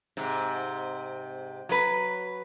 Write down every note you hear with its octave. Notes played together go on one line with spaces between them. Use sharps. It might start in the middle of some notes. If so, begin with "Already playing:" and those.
G#2 C3
F#3 B4